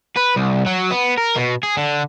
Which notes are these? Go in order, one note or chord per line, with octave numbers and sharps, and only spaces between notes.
B4
C2
F#3
B3
A#4
B2
G#4
D3